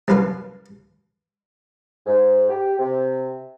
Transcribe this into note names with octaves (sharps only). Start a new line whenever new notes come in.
C2 F#2 A#4 B4 F5
G#2
G4
C3